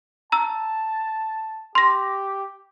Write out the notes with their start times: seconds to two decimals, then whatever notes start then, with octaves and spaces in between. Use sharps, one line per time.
0.32 A5 A#5 E6
1.75 G4 C6 A#6